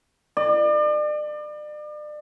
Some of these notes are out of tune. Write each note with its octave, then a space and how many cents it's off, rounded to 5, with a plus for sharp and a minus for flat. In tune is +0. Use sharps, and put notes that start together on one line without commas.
D5 +35